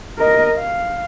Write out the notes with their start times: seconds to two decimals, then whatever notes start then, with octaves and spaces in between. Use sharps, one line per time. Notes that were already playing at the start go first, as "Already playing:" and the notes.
0.18 A#4 D#5
0.57 F5